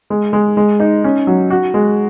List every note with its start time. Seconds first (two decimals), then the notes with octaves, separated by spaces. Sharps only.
0.10 G#3
0.33 G#3
0.57 G#3
0.80 D#4
1.04 C#4
1.27 F#3
1.50 F#4
1.74 G#3